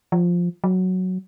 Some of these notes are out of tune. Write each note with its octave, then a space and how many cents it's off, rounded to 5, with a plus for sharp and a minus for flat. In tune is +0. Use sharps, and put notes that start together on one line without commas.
F3 +5
F#3 +0